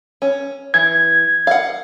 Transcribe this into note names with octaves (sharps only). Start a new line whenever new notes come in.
C#4
E3 G#6
F5 F#5